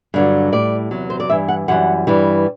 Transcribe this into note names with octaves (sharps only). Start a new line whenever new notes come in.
G2 D3 F#3
A2 G3 D5
E2 C3 F#3
C5
D5
G2 E3 G3 E5
F#5
F#2 E3 G3 F#5
G2 E3 G3